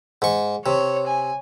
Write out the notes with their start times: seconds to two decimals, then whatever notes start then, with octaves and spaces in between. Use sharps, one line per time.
0.22 G#2 C#6
0.66 C3 C#5
1.08 G#5